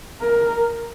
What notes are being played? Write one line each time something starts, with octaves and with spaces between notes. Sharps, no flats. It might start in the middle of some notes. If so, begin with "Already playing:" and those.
A#4